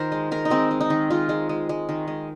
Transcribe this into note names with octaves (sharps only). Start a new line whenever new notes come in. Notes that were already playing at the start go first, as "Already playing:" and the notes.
Already playing: D#3 F4 A#4 C5
G#3
G#3 A#4
D#4
G#3 C4
G#3
D#4
D#3
G#3 F4
G#3
G#3
G#3
D#3
G#3